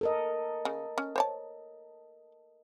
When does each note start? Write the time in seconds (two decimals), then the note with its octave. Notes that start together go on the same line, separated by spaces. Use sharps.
0.01 A4 A#4 D#5
0.65 C#3
0.98 C#4
1.16 C5 C#5 A5